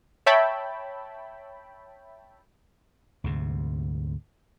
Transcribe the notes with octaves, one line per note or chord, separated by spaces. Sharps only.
C#5 E5 G5 A5 B5
D2 G#2 C3